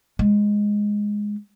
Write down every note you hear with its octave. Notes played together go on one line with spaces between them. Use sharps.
G#3